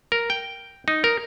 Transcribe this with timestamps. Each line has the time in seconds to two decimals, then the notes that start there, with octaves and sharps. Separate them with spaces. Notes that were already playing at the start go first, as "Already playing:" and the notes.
0.12 A#4
0.30 G5
0.88 D#4
1.04 A#4